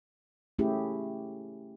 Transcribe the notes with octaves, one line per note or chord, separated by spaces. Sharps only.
A3 C#4 E4 G4 G#4